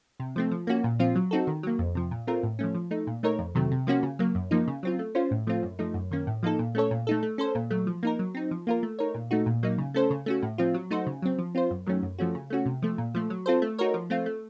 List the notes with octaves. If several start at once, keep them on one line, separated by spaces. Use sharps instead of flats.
C3
F3 A3 C4
F3
A#3 C#4 F#4
A#2
F3 C4 F4
F#3
C4 D#4 F#4 A4
D#3
F#3 A#3
F2
C3 F3
A#2
A3 C4 F4 A#4
A2
F3 A3 C#4
F3
A3 D#4
A#2
A3 D#4 A#4 C#5
F2
C3 D#3 F#3 A3
C3
F3 A#3 C#4 F#4
C#3
F#3 A#3
F#2
F3 A#3 D#4
C#3
F#3 C4 F4
A3
C#4 F4 C5
A2
F3 A3 C4 F4
F#2
F3 A3 D#4
F#2
D#3 A#3 C#4
A2
F3 A#3 D#4 A4
A#2
A3 C#4 A4 C#5
A#2
A3 D#4 A4
A3
C#4 A4 C5
A#2
F#3 A3
F3
A#3 D#4 A#4
F#3
C4 D#4
F3
A#3 F4 A#4
A3
D#4 A#4 C#5
A#2
A3 D#4 F#4
A#2
F#3 A#3 D#4
C#3
A3 C#4 A4 C5
C#3
A3 C#4 F#4
A2
F3 C4 F4
F#3
A3 D#4 F#4 C5
C#3
F#3 C4
F3
C4 F4 C5
F#2
D#3 F#3 A3 C#4
F#2
F3 A3 C#4 F#4
C#3
A3 C#4 F#4
C3
F3 A3
A#2
F3 A3
F#3
C4 F4 A4 C5
A3
D#4 F#4 A#4 C#5
F3
A3 C4 F4
A3